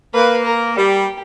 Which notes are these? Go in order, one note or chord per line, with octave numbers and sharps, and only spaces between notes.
A#3 B4
A#4
G3 G4